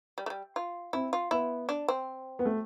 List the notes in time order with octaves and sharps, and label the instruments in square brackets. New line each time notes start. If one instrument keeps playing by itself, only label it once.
[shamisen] G3
A3
G3
F4
[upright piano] C4 [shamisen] E4
[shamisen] F4
[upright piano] B3 [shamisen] E4
[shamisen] D4
C4
[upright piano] B3
A3